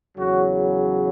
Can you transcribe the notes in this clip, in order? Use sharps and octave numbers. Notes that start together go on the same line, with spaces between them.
E2 C#3 F#3 F#4